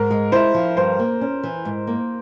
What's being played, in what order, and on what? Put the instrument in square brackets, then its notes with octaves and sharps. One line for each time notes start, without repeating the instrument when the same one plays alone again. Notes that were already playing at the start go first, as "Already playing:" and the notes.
Already playing: [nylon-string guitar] G#2 [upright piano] A#4
[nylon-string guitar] G#3
[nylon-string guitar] E4 [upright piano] C5
[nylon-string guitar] F3
[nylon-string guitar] G2 [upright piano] C5
[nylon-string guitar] A#3
C#4
E3
G#2
A#3